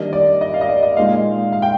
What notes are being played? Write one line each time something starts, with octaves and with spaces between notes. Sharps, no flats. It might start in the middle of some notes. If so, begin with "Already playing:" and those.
Already playing: D#3 G3 A#3 D4 D#5
D5
D#5
F5
D#5
D5
D#5
A#2 G#3 D#4 F5
F5
G5